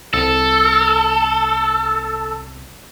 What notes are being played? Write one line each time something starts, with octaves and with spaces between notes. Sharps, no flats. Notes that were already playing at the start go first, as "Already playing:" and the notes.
C2 A4